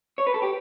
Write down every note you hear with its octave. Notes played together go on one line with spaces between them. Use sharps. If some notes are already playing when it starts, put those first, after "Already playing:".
C#5
B4
A4
G4